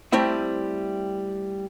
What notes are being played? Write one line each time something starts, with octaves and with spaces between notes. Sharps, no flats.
G3 A3 C4 E4 E5